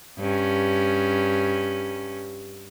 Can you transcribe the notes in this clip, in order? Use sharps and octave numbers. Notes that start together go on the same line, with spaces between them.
G2 C#4